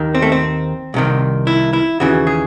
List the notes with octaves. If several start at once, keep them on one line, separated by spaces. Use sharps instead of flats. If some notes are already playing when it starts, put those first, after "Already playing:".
Already playing: D#2 D#3
C4
A3
C4
C2 C3 D#3
E4
E4
D#2 C#3 E3 F#4
G#4